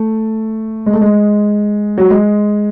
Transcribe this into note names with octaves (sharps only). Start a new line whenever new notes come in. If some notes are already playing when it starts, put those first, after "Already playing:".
Already playing: A3
G#3
A3
G#3
F#3
G#3